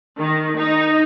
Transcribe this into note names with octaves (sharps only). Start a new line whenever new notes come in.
D#3
D#4